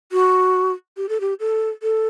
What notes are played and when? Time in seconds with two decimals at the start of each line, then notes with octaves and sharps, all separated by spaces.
0.12 F#4
0.97 G4
1.09 A4
1.21 G4
1.40 A4
1.83 A4